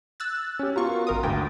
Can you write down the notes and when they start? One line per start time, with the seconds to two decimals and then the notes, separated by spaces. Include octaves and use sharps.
0.20 E6 F#6 A6
0.59 C#4 G4
0.76 B3 F4 F#4 A#4 C#6
1.07 G#1 A#4 D#6
1.23 D2 G#2 G5